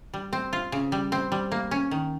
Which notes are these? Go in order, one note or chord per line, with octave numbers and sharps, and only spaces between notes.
G3
C4
F4
C#3
G3
C4
G3
A#3
C#4
D#3